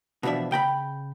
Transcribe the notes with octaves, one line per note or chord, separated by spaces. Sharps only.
B2 E3 F3 D4 E5
C#3 G5 A#5 B5